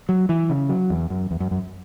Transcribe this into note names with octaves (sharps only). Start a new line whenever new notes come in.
F#3
E3
C#3
F#3
E2
F#2
E2
F#2
F#2